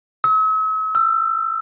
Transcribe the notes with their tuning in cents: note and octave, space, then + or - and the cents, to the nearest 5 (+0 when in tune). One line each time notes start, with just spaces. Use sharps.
E6 -45
E6 +25